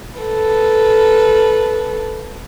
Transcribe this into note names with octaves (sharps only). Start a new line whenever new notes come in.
A4 B4